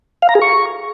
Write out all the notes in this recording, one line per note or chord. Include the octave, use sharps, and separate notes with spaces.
F5
A#5
G#4
C#6